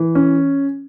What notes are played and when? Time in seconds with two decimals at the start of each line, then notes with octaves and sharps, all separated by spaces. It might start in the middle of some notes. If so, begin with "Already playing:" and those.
Already playing: E3
0.15 C#4